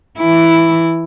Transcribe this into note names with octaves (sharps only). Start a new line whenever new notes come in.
E3 E4